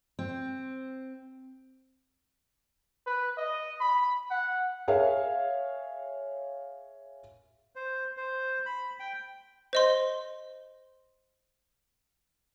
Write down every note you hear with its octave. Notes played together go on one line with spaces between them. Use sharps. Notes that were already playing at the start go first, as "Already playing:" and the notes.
C4
B4
D#5
B5
F#5
G#4 A#4 C#5 E5 F5
C5
C5
B5
G5
C5 D#5 C6